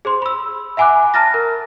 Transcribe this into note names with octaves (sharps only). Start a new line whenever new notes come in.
G#4 C5 C6
B5 E6
E5 F#5 G#5 B5 D6 F#6
A5 A#5 F6 A6 A#6
A#4